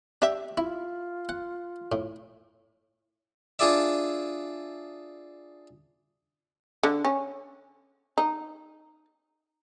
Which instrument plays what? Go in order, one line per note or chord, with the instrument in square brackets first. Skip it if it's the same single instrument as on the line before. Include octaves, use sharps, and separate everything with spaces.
[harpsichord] D4 [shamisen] G4 E5
[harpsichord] E4 [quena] F4
[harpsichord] F#5
A2
D4 F4 G#4 D5 E5
[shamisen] D3
C#4
D#4